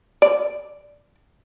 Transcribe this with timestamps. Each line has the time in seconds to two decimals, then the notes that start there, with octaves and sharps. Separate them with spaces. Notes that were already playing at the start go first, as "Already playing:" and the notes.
0.22 D5